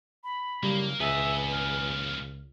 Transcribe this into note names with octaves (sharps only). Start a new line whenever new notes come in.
B5
C#3 F#3 G3 A#3
C#2 B3 G#4 B4 D#5 E5 G#5
D#2 C#3 F6